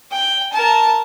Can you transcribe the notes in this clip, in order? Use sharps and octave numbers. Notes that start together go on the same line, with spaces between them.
G5
A#4 A5